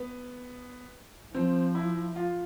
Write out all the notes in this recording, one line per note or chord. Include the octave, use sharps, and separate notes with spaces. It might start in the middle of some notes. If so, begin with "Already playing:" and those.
Already playing: B3
F3 C4
E4
F4